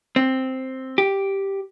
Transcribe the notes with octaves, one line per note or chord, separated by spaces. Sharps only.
C4
G4